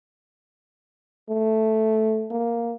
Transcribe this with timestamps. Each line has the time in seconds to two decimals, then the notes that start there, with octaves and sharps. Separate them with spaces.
1.29 A3
2.31 A#3